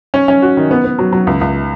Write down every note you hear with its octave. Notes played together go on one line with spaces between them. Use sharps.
C#4
C#4
F#4
D#3
B3
B3
F#3
F#3
C#2
C#2